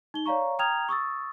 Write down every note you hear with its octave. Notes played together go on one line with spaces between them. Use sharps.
D#4 G7
C#5 D5 F5 A#5 C#6
G5 A#5 D#6 F6 G#6 F7
C#6 D#6 E6 A6